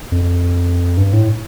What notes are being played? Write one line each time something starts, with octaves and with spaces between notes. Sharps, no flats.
F2
G2
A2